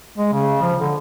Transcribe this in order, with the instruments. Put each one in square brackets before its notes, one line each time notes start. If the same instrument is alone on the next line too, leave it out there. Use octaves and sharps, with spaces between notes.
[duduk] G#3
C#3
F3
D3